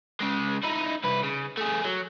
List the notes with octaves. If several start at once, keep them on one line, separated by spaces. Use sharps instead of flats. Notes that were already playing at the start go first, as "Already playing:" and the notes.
C#3 G#3
D#4 E4
C2 B4
C#3
A3 G#4
F#3